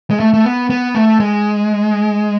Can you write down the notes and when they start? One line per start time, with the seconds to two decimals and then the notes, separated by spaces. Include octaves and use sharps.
0.11 G#3
0.20 A3
0.34 A3
0.45 B3
0.70 B3
0.95 A3
1.20 G#3